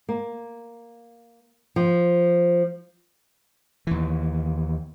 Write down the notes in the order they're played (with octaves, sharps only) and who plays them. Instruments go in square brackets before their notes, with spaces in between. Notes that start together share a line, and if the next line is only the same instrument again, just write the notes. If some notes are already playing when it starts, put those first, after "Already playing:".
[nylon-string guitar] A#3
F3
[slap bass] D#2 E3